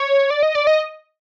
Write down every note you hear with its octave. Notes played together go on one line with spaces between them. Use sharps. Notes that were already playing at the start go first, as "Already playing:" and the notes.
Already playing: C#5
D5
D#5
D5
D#5